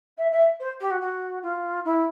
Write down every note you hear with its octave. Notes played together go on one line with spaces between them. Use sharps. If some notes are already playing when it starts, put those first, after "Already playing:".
E5
E5
C5
G4
F#4
F#4
F4
E4